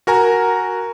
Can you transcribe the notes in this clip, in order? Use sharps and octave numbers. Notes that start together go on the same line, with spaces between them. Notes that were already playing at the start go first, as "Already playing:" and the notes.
F#4 A#4 G#5 A#5